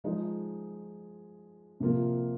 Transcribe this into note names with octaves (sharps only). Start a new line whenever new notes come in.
F3 G#3 D#4
C3 F3 A#3 F4